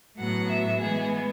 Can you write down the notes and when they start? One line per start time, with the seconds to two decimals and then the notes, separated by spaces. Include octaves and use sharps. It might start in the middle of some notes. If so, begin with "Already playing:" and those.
0.19 A2 F#3 B3 F#5
0.50 E5
0.80 E3 G#3 B3 G#4